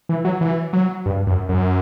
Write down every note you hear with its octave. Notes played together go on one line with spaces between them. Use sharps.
E3
F#3
E3
F#3
G2
F#2
F#2